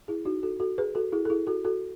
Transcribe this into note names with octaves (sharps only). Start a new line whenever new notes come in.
E4 G#4
D#4 F#4
F#4 A4
F#4 A4
G#4 B4
F#4 A4
E4 G#4
A4
E4 G#4
F#4 A4
F#4 A4